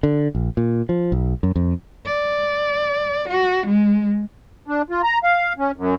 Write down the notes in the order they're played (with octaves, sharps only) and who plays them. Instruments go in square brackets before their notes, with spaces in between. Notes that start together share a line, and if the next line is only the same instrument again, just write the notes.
[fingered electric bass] D3
A#1
A#2
F3
B1
F#2
F2
[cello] D5
F#4
G#3
[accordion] D4
F4
A#5
F5
C#4
F#2